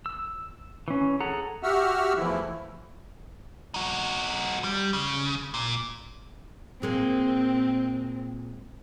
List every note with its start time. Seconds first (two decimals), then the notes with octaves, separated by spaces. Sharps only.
0.06 E6
0.88 E3 C#4
1.21 G#4 A4 F#5 A#5
1.63 F#4 G4 E5 F#5 E6 F6
2.18 E2 E3 F3 A3 E4
3.74 D#4 F#4
4.64 G3
4.93 C#3
5.54 A#2
6.82 A#2 G#3 A#3 C4